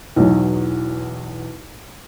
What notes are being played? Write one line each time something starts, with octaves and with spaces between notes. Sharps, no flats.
B1 E2 F#3